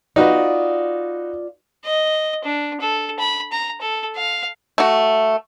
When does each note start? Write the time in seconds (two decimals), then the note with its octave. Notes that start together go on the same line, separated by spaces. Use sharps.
0.16 D#4 F4 F#4 B4 D5
1.85 D#5
2.45 D4
2.81 A4
3.19 B5
3.52 A#5
3.81 A4
4.16 F5
4.78 A3 F#4